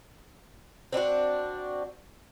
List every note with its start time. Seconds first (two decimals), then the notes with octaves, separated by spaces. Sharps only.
0.93 C4 D4 D#4 F#4